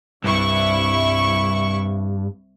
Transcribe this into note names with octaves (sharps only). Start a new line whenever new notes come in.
C2 G2 E4 C#6